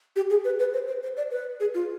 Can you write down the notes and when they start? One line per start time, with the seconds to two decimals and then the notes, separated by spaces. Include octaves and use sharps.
0.16 G4
0.30 G#4
0.45 B4
0.60 B4
0.73 C5
0.87 C5
1.02 C5
1.17 D5
1.31 B4
1.60 G#4
1.74 F4